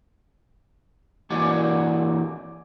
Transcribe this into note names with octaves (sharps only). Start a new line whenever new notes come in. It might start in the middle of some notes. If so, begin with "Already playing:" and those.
E3 A#3 F#4 D5 G#5